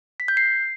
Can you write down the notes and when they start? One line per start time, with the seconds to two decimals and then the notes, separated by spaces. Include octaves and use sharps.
0.20 B6
0.28 G6
0.37 C7